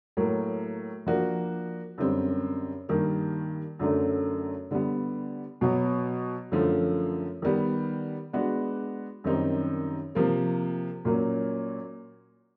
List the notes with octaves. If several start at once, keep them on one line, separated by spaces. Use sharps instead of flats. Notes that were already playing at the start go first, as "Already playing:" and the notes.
A2 F#3 A#3
F3 A#3 D4 F#4
F#2 D3 G3 C4
G2 D#3 G3 A#3
F#2 D3 F#3 A3 D4
D3 G3 B3
B2 F#3 B3
F#2 D3 F3 A3
D#3 G3 B3
G#3 B3 D4 F#4
F#2 D#3 G3 C4 D#4
C3 F3 A#3
A#2 F#3 A#3 C#4